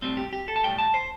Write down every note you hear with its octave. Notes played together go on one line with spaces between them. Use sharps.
B1 A2 G3 C4
G4
G4
A4
A5
B1 A2 G3 G5
A5
C5